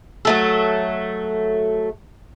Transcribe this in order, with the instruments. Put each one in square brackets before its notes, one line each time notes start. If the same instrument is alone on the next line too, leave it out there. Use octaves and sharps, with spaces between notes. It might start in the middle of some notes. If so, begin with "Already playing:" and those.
[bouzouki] F#3 A3 A4